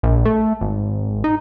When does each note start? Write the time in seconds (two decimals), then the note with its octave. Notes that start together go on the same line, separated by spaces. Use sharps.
0.03 A#1
0.25 A3
0.61 G#1
1.24 D#4